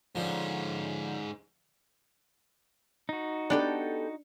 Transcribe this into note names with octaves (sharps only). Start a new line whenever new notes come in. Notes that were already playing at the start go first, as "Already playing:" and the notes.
G#2 D3 F3 C#4
D#4 F#4
B3 D4 G4 A4